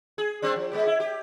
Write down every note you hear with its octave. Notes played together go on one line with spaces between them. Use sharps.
G#4
G3 C4 D4
F3
G#3 B3 G4
E4
G4